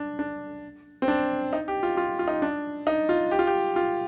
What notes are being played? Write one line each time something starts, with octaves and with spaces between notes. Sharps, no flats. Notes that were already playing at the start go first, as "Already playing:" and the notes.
Already playing: D4
D4
C4
D4
D#4
G4
F4
F4
F4
D#4
D4
D#4
F4
G4
F4
G4
F4